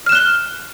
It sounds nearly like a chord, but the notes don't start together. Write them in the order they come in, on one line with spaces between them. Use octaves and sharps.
F6 E7 F#6 G7